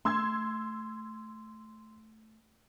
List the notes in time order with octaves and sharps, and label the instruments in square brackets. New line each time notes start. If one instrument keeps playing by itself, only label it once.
[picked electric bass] A3 [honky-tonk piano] C6 E6 G#6